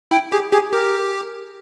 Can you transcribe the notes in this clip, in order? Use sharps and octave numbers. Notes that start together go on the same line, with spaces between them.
E4 G5
G4 G#4
G4 G#4
G4 A#4